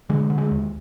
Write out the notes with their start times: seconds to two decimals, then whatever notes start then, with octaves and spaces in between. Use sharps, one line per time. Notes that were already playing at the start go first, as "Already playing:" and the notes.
0.09 D3 G#3
0.30 D3
0.38 G#3
0.51 D#2